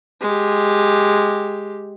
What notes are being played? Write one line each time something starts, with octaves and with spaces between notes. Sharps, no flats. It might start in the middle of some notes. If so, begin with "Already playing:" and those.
G#3 G4